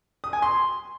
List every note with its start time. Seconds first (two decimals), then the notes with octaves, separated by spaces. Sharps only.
0.24 D#6
0.33 G#5
0.42 C6